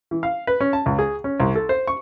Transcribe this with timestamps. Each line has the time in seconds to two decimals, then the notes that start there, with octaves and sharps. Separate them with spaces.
0.11 E3
0.23 F5
0.47 B4
0.60 C#4
0.73 A5
0.86 C#2
0.99 G#4
1.24 C#4
1.40 C2
1.55 A4
1.69 C5
1.87 C#6